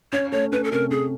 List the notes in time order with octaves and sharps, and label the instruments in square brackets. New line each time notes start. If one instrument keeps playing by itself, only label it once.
[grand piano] C#4 [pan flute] C#5
[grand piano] A3 [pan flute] C#5
[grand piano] C#4 [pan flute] B4
[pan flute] A4
[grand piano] C3 [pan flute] A#4
[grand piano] C#4 [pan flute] G#4